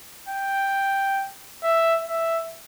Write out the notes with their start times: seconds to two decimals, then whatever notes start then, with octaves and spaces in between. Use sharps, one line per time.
0.28 G5
1.63 E5
2.08 E5